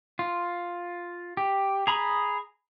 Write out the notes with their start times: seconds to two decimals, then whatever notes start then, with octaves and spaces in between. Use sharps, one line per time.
0.19 F4
1.37 G4
1.87 G#4 A#5 B5 D#6